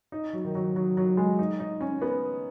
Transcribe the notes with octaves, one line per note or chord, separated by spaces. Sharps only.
D#4
F#3
D#3
F#3
F#3
F#3
G#3
D#4
D#4
C#4
B3